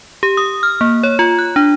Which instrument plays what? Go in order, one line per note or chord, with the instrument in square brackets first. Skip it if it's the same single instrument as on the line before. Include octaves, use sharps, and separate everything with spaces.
[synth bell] G4
D#6
F6
A#3
C#5
F4
F#6
D4